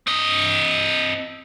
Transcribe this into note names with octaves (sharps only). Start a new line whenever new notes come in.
C4 D#5